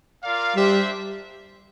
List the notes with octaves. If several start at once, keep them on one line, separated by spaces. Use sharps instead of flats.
F4 A#4 D5 F5
G3 D4 G4 C5 E5